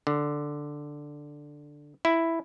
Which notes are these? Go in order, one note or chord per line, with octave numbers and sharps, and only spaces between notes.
D3
E4